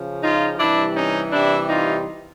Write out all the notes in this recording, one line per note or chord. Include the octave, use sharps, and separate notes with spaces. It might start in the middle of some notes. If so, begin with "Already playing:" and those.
Already playing: C#3 F3
D#4 F4
C3 E3 G3 D4 E4
C#4 D#4
C3 E3 G3 D4 E4
D#4 F4